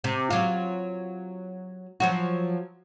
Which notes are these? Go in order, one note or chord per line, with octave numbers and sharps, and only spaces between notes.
C3
F#3 F4
F3 F#3 F#4